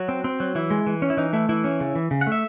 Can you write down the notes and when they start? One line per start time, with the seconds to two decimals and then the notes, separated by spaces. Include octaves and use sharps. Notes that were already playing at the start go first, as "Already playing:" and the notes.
Already playing: F#3 F#4
0.09 C4
0.24 C4
0.40 F#3
0.55 E3 E4
0.70 G#3
0.87 E3
1.02 C#4
1.10 E4
1.17 E3 D#4
1.33 A3 E4
1.49 E3 E4
1.64 C#4
1.80 C#3
1.96 E3
2.11 C#3
2.21 F#5
2.27 A3
2.32 E5